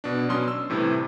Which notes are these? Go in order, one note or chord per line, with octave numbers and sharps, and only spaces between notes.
B2 D4
B2 F#3 C#4 D4 C6 D#6
E6
A2 C3 E3 G3 A3